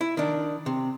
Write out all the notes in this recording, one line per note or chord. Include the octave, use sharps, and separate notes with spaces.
E4
D#3 D4
C3